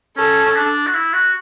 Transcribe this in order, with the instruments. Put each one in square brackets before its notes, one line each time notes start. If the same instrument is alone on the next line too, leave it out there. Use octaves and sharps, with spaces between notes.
[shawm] C#4 [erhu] A4
[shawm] C#4
D4
F#4
E4
F#4